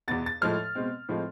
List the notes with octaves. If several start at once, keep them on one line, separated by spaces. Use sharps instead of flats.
E2 B2 B3 A6
A6
A2 F3 G#3 F6
B2 G#3 C4
A2 F3 G#3 C4